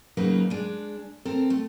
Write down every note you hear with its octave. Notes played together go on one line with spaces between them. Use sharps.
C#3 F#3 A#3 D#4 B4
G#3 D4
C4 A4 A#4
A3